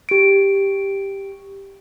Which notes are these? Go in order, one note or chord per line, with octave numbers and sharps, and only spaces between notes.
G4 D7